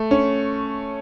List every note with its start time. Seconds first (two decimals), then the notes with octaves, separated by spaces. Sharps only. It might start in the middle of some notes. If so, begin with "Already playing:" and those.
Already playing: A3
0.11 C#4